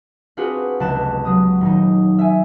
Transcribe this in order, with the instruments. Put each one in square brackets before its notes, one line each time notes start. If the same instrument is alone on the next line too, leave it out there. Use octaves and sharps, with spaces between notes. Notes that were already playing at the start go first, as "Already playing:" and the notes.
[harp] C4 D4 F4 F#4 G#4 B4
F1 C#2 B3 A5 F#6 E7
F#3 D#6
D#1 D#4
E5 G#5